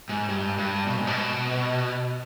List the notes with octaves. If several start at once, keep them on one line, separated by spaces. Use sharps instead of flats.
G#2
G2
G2
B2
G#2
B2